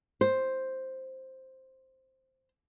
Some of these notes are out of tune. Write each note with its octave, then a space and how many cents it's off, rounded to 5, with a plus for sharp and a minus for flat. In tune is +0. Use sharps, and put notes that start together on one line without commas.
C5 +5